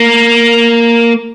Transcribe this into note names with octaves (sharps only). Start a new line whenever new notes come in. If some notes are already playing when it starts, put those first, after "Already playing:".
Already playing: A#3